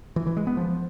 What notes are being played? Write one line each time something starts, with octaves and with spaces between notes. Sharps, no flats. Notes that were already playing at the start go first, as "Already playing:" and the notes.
E3
E3
G#3
B3
F3